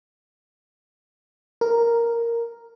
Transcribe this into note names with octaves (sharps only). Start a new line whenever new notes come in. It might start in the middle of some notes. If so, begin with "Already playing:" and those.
A#4